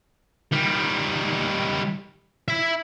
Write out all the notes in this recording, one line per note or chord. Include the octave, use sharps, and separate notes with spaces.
D#3 G3
E5 B5